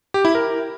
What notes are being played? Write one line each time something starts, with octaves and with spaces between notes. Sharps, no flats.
G4
E4
A#4